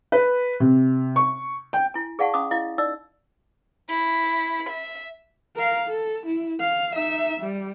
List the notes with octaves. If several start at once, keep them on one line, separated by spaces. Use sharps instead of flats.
B4
C3
C#6
G5
E4 G#5
G#4 D5 F5 F#5 A5 C#6
C#4 F5 B5 D6 D#6
E4 D#5 F5
D#4 D5 D#5 E6
E4 B6
E5
A#4 F5
A4
E4
F5
D#4 E5
G3